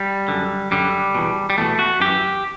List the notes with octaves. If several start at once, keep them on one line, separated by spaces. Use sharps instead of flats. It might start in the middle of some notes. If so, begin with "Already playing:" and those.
Already playing: G3
F#2 D3
F#2 D3 G3
E2 B2
G3
E2 B2 A3
F#4
F#2 E3 G4